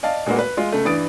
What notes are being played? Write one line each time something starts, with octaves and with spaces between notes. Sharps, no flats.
D5 D#5 F5 A5
A#2 G#3 A#3 B3 F#4
B4
G#3 F4
C#2 A3
G2 E3 D5 D#6 A6 D7